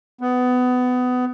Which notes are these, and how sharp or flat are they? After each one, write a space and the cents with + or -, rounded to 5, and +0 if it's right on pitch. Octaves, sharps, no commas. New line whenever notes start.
B3 +20